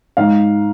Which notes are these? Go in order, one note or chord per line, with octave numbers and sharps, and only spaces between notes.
G#2 F5